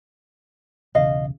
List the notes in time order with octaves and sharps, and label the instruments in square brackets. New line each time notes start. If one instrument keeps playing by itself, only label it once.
[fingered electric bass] B1 E2 C#3 [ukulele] D#5 F5